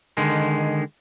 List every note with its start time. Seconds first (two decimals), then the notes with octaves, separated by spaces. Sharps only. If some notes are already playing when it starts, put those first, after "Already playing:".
0.17 D3 D#3 G#3